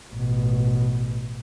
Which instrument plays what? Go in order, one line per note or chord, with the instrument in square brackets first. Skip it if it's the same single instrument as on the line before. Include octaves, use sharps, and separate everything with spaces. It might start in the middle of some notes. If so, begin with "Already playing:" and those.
[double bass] A1 B2